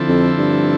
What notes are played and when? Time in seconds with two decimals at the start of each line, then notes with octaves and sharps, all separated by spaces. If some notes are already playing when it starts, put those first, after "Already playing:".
Already playing: D3 F3 C4 E4 A4
0.08 F2
0.38 G2